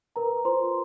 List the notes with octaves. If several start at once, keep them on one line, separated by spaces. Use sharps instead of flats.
A#4 B4 A#5
F4 C5 C6